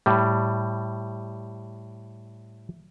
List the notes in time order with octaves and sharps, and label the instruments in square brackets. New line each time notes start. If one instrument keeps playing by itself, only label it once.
[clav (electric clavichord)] A2 G3